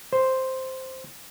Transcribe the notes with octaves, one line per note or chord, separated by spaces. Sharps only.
C5